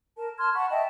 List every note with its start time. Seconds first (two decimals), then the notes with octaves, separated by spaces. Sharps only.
0.17 A#4 A5
0.38 A5 C6 F6 G#6
0.53 F#5 A5 B5 C#6
0.70 D#5 E5 G5 A5